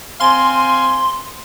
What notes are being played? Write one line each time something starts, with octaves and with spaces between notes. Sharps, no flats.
C4 F5 G#5 C6